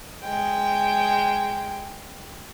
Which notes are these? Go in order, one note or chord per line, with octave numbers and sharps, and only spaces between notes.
G#3 G5